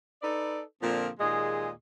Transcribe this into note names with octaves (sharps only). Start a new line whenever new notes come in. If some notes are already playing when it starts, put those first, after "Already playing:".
D#4 A4 B4 D5
A#2 D3 F3 A#3 C4
D#2 A#2 G#3 G#4 D#5